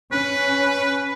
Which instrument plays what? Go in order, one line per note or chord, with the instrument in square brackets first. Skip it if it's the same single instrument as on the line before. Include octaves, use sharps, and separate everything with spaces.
[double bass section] C#4 [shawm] B4